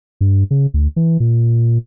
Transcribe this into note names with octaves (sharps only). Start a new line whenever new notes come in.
G2
C#3
D2
E3
A#2